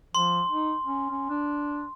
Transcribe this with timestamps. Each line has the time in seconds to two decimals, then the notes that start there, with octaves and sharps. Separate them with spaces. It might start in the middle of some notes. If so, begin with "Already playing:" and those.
0.15 F3 C6
0.49 D#4
0.86 C#4
1.10 C#4
1.29 D4